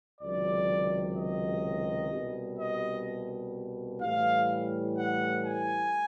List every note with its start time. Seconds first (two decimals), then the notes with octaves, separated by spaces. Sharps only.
0.21 C#2 C3 D#3 F#3 D5
1.16 D#5
2.11 C2 B2 G3
2.59 D#5
4.01 A2 E3 G3 F5
4.97 F#5
5.45 G#5